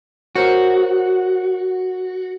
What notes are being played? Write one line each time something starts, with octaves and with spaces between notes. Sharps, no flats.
F#4 A#4 C5 C#5